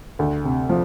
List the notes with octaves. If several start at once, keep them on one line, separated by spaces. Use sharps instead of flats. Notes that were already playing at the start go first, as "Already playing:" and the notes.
D2
C3
F3